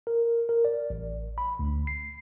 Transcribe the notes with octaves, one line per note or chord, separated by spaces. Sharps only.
A#4
A#4
D5
A1
B5
D2
C7